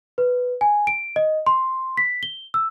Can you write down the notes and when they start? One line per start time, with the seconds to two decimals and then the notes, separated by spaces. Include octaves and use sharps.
0.18 B4
0.61 G#5
0.87 D7
1.16 D#5
1.47 C6
1.97 B6
2.23 G7
2.54 E6